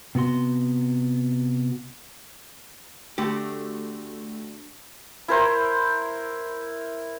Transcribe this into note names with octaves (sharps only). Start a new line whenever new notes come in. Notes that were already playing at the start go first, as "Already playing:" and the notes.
C3 B3 F#4 C6
D3 A3 F#4 G4
E4 A#4 C5